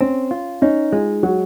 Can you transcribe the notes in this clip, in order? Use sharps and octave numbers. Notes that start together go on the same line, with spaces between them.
C4 C#4
F4
C#4 D#4
G#3 F4
F#3 F#4